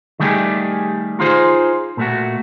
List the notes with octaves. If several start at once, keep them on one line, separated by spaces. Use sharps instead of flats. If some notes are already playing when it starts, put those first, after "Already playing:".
D#3 G3 A3 G4 G#4
D#4 F4 G#4 C5
A#2 A3 F#4